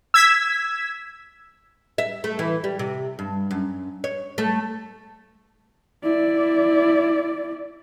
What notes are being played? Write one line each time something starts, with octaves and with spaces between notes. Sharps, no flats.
E6 G#6 B6 E7
E5
A3
E3
G3
C3
G2
F#2
C#5
A3
E4 D5